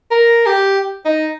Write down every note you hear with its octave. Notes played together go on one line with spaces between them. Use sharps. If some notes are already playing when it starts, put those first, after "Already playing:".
A#4
G4
D#4